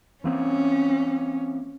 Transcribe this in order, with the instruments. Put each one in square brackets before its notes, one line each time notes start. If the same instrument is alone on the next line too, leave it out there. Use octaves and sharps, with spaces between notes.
[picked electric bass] E3 A#3 C4 [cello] C#4